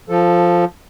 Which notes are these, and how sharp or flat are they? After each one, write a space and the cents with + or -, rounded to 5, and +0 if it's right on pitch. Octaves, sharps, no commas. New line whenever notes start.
F3 +0 A4 +0